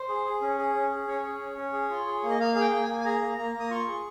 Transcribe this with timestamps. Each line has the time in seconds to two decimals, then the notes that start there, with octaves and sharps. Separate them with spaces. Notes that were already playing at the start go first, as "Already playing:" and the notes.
Already playing: C5
0.09 G#4
0.25 G#4
0.42 C#4
0.59 G#4
0.75 C#4
0.91 G#4
1.07 C#4 C#5
1.24 G#4
1.40 C#4
1.57 C#4
1.73 G#4
1.90 F4
2.07 G#4
2.23 A#3
2.30 D#5
2.40 A#3 F5
2.55 G#4 F5
2.61 G5
2.72 A#3
2.83 G#5
2.89 A#3
3.00 G#5
3.05 G#4 A#5
3.21 A#3
3.38 A#3 A#5
3.54 A#3
3.60 D#6
3.71 F4 C#6
3.88 G#4